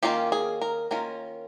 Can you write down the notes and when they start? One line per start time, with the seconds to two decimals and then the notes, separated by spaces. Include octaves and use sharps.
0.03 D#3 A#3 C#4 F4 G4
0.32 G#4
0.62 A#4
0.91 D#3 A#3 C#4 F4 A#4